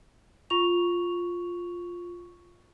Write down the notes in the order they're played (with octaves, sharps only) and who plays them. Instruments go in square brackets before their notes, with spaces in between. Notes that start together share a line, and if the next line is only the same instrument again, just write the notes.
[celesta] F4 C#6 F7